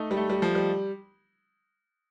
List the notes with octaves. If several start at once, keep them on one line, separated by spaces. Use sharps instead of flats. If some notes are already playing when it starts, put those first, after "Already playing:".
Already playing: A3 D#4
G3
A3
G3
F3
G3